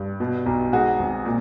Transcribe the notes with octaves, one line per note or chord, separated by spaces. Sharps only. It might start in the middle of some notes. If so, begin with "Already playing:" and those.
Already playing: G2
B2
B1
G#2 F#4 G#4
G#1
A#2